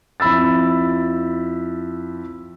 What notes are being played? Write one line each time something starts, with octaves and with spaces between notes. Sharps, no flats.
F2 E4 B5 E6 A6